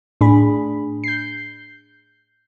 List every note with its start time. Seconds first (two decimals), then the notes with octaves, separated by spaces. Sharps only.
0.21 A2 D4 G#4 B5
1.04 G6 C7